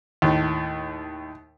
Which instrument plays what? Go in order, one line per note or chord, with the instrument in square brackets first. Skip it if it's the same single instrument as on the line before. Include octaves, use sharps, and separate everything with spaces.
[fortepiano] D#2 A2